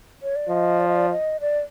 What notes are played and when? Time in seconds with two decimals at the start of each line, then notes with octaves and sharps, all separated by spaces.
0.22 C#5
0.36 D5
0.49 F3 D#5
0.80 D5
0.88 D#5
0.96 D5
1.10 D#5
1.41 D5